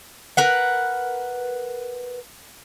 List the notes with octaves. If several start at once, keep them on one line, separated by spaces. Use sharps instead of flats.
A#4 B4 F#5